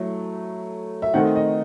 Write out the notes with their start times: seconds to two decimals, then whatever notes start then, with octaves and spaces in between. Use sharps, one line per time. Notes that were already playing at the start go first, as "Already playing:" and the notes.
Already playing: F#3 A3 E4
1.02 E5
1.14 D#3 A3 C4 D#4 F#5
1.36 D#5